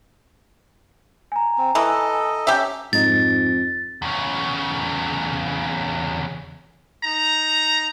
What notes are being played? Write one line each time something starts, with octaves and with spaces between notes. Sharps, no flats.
G#5 A#5
C4
E3 A4 D#5
C#4 G4 E5
F2 G#2 D#4 A6
E2 C#3
D#4 A#5